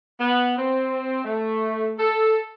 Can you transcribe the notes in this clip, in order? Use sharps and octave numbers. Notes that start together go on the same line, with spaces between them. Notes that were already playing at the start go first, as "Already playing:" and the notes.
B3
C4
A3
A4